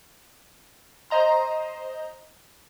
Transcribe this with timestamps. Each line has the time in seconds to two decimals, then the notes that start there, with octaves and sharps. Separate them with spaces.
1.10 C5 D#5 A#5 C6